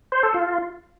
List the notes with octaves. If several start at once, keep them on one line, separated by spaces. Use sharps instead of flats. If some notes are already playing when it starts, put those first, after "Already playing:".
C5
A4
F4